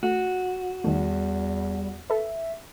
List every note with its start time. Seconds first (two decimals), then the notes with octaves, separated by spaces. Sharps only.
0.03 A3 F#4
0.84 E2 D#3 G3 A3
2.10 A4 B4 E5